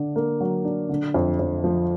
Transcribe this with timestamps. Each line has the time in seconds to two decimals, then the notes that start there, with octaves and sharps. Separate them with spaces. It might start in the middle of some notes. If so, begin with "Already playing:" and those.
Already playing: D3 D4
0.16 A#3
0.40 F#3
0.65 D4
0.89 D3
1.14 F2
1.39 F2
1.64 F3